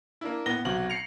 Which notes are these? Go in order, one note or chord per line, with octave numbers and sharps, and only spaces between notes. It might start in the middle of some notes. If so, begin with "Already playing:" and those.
A#3 D4 E4
A2 B3 A#6 G7
B1 C3 F#4 F#7
C7 C#7 F7